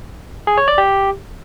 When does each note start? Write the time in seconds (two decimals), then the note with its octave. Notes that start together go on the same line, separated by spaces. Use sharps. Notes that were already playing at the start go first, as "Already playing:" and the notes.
0.47 G#4
0.57 C#5
0.68 D5
0.78 G4